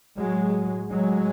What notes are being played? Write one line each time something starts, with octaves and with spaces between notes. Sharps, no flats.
A2 F#3 G#3
F#3 G#3